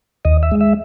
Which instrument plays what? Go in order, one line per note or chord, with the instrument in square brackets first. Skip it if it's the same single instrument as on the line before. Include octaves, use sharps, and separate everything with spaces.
[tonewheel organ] D#2 D#5
E5
G#3
E5